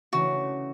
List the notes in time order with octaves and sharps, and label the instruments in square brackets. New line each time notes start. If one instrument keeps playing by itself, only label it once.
[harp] C#3 E3 A3 D4 [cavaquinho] F#4